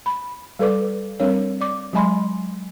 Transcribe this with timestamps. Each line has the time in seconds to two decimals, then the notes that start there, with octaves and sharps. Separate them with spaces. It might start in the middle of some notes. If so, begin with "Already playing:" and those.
0.06 B5
0.59 G3 A4 B4 D5 D6
1.20 G3 C4 D4 A#4 C#5
1.61 D5 D6
1.93 F#3 G#3 D#5 G#5 B5 C6